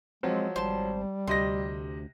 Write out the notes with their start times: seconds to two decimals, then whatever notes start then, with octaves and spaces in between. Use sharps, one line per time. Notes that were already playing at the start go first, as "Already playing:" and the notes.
0.23 F3 F#3 G#3 C4
0.56 G#1 G3 C5 A5
1.27 D2 C3 D#5 C6 A#6